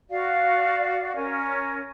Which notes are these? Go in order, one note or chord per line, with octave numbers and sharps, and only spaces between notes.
F#4 D5 F5
C#4 A#4